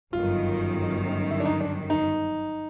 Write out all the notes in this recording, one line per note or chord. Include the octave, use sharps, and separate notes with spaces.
G1 F#2 D#3 F4
E4
D4
D#4
D4
D#4